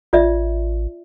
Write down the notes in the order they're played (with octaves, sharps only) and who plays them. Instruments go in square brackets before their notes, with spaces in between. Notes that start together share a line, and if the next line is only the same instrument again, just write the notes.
[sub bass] A1 [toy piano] F4 D5 E5